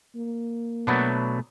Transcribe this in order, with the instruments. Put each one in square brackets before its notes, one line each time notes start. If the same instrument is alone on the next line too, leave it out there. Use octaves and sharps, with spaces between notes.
[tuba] A#3
[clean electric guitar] B2 A3 [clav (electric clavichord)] F#3 B3 D4